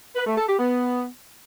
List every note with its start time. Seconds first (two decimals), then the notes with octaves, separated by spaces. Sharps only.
0.16 B4
0.27 A3
0.38 A4
0.48 G4
0.59 B3